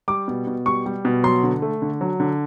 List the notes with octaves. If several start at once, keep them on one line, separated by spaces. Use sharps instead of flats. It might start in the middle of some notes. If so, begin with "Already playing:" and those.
G3 D6
B2
B2
G3 C#6
G3
B2
F#3 C6
D3
A3
D3
F#3
D3